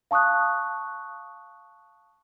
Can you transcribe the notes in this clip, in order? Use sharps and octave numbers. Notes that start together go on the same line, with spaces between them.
F5 A5 C#6 D#6 F#6